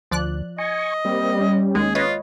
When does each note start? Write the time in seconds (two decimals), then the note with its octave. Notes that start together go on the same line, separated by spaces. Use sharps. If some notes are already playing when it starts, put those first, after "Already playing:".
0.11 D2 F3 D5 F#6
0.58 D#5 G#5 C#6
1.05 G3 A#3 C4
1.41 C#4
1.75 D#2 G#3 G#4
1.95 F4 B4 C#5 D#5